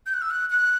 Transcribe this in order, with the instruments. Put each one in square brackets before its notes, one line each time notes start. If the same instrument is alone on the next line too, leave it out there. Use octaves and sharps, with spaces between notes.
[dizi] G6
F#6
E6
F#6
F#6